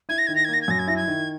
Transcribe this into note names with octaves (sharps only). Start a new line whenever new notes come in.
E4 G#6
A#6
D#3 G#6
A#6
G#6
A#3 A#6
G#6
F#2 A#6
G#6
E4 A#6
G#6
D#3